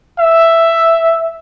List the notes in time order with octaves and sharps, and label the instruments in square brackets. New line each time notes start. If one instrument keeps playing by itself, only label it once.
[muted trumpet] E5